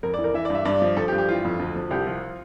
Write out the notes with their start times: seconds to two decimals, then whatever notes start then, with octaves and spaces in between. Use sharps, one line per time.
0.03 F2 A#4
0.14 D5
0.19 E3
0.24 A#4
0.34 E3 E5
0.45 D5
0.50 G2
0.55 E5
0.65 G2 D5
0.82 F3
0.97 F3 A4
1.08 G4
1.12 G2
1.18 G4
1.29 E3 F4
1.45 F2
1.59 D2
1.76 F3
1.91 C2 G4
2.07 F3 F4